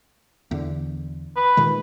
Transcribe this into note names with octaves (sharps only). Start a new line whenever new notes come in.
E2 D3
B4
A#2 D#3 G#3